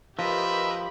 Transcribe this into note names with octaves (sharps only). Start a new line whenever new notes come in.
F3 G4 A#4 B4 D#5 E5 B5